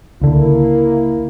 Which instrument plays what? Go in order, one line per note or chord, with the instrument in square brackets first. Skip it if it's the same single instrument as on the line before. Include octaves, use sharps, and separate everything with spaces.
[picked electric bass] C#2 D3 [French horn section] A#3 E4